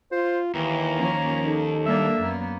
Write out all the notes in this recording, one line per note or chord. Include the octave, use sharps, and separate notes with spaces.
F4 C5
D#2 E3 A#5
F3 A#3 C#4
D#4 A4
G3 A#3 D4 E5
F#2 A#3 B3